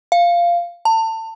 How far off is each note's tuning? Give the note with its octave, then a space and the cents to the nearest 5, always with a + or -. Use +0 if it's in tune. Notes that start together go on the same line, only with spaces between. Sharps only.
F5 -10
A5 +30